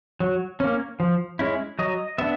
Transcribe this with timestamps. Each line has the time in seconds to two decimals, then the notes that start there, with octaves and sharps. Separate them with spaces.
0.20 F#3
0.60 A#3 C#4
1.00 F3
1.39 G#3 C#4 E4
1.79 F#3 D#5
2.18 B3 D4 E5